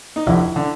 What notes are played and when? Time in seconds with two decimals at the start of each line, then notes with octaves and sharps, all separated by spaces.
0.16 D#4
0.26 F1 F2 D3 E4
0.56 D3